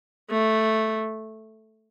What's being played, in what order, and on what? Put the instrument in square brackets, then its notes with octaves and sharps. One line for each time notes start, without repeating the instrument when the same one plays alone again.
[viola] A3